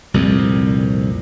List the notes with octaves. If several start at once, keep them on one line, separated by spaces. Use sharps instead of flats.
C2 F2 A#2